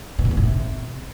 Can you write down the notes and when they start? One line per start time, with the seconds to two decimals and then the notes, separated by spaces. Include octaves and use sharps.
0.19 B2
0.25 E2
0.31 C#3
0.37 A#2
0.43 C3